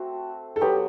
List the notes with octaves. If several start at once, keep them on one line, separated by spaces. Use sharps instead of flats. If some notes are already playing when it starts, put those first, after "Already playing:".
Already playing: A3 C4 F#4
A4
F#3 B3 F#4 G4 B4